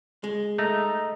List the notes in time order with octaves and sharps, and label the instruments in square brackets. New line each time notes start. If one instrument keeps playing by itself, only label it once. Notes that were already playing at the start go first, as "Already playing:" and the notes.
[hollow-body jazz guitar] G#3
[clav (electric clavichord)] A3 [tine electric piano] D#5 A#5